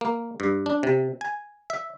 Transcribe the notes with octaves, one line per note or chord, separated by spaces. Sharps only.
A#3
G2
D4
C3
G#5
E5